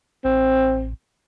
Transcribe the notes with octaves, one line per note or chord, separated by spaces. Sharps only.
A1 C4